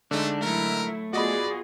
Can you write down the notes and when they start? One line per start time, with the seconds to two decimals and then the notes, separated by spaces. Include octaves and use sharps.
0.11 D3 G#3 A3 D4 D#4
0.41 F#3 A3 E4 A#4
1.13 B3 F4 F#4 G#4 D5 D#5 B5